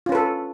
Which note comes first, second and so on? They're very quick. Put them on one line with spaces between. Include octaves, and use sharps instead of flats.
F4 C#4 B4 A4